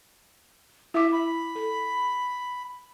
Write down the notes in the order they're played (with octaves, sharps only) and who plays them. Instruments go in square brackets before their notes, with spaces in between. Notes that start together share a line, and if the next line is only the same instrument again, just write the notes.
[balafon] E4 D6 [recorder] E5
[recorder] B5
[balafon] A4